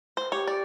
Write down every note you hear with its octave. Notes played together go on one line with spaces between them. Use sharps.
C5
G4 C#5
D5